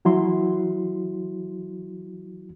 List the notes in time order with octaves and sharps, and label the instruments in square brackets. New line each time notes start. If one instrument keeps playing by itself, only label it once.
[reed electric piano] E3 F#3 E4 F#4 C6